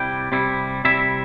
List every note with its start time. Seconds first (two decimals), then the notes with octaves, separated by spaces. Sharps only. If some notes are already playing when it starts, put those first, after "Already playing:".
Already playing: C3 G3 E4 G5
0.32 C3 G3 E4
0.85 C3 G3 E4 E5